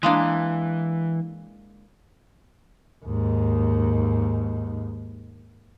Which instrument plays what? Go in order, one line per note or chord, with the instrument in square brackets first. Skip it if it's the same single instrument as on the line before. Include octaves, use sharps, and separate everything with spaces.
[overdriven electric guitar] E3 [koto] G#3 A#3 D4
[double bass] D#2 G#2